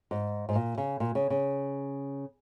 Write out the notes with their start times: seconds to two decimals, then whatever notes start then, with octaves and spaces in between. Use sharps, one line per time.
0.11 G#2
0.49 G#2
0.55 A#2
0.78 C#3
1.00 A#2
1.15 C#3
1.30 C#3